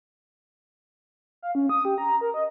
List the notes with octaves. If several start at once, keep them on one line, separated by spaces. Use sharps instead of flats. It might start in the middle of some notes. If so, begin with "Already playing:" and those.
F5
C#4
D#6
G4
A#5
A#4
D#5